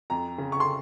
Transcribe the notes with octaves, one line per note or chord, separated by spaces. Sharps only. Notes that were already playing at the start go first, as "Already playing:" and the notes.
F2 A#5
C#3
C#6
C6